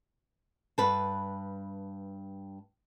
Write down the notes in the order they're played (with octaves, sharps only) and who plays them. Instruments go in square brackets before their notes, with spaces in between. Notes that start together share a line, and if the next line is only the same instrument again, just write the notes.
[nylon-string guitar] G2 B4 A5